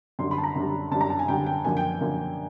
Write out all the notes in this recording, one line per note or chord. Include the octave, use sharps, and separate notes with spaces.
F#2 D3 G3 C6
B5
A5
A#5
F#2 D3 G3
F#2 D3 G3 A5
A#5
A5
G#5
F#2 D3 G3 G5
G5
F#2 D3 F3 A#3 G#5
G5
F#2 D3 F3 A#3